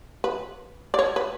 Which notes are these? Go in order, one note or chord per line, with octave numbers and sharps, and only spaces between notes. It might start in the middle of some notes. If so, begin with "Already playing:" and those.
B4
D5
C#5
B4